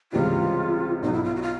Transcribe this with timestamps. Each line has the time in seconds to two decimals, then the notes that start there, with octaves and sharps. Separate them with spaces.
0.12 C#2 C3 E3 G3 F4
1.02 B1 B2 F#3 D#4
1.13 E4
1.24 F4
1.36 F#4
1.42 F4